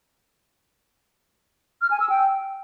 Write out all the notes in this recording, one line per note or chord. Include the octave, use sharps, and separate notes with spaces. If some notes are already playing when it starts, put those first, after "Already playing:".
F6
G#5
E6
G5